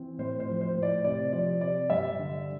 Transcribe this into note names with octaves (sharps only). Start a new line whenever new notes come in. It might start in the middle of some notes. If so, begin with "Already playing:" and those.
Already playing: E3 C4
A2 C5
C5
F3
C5
A2
D5
C3 D5
F3 D5
C3 D5
G2 E5
D3